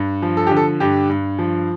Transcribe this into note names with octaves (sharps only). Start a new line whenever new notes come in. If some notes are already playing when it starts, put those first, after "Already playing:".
Already playing: G2
F3
A4
D3 G4
A4
G2 G4
G2
F3